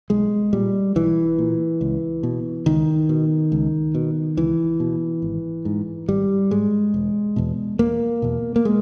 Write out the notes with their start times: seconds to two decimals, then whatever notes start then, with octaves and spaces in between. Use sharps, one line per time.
0.10 B1 G#3
0.53 A#2 G3
0.96 B1 E3
1.39 A#2
1.81 C#2
2.23 B2
2.66 C#2 D#3
3.09 B2
3.52 C#2
3.95 B2
4.37 C#2 E3
4.80 B2
5.22 G#1
5.65 G#2
6.08 G#1 G3
6.51 G#2 G#3
6.94 E1
7.36 E2 B2
7.79 E1 A#3
8.22 E2 B2
8.56 A#3
8.65 G#3